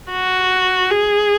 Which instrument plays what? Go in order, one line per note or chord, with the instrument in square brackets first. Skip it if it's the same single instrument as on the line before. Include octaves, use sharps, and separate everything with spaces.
[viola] F#4
G#4